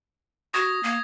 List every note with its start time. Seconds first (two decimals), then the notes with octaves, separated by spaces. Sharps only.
0.54 F#4 D#6 G#6 A#6
0.83 A#3